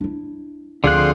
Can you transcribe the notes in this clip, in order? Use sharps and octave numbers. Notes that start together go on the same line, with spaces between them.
D4 E4
D2 D3 F3 C4 G#4 F#6